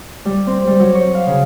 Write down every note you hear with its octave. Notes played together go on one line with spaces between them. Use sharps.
G3
C4
G3
F#3
C#5
F5
C#3